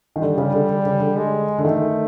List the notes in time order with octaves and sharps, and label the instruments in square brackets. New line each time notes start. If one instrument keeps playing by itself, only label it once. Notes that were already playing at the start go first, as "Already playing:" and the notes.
[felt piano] D#3
[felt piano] D3 [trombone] G3
[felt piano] C#3
D3
D3
C#3
D3
[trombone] G#3
[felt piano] D3
[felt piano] D#3 [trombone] A3